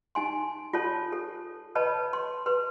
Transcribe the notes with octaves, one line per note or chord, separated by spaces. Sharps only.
D#4 G#5 C6
F4 A4 C#5 A5
A4
B4 C#5 D#5 A5 B5
C6
B4 C6